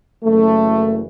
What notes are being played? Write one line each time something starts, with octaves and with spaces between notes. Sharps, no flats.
F#1 F#2 E3 A3